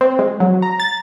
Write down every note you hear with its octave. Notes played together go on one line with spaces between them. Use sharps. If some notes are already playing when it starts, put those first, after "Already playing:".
C4
G#3
F#3
A#5
A6